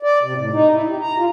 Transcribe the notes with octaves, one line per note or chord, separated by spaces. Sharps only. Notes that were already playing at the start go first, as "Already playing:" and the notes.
D5
C3
A2
D#4
E4
G4
A#5
F4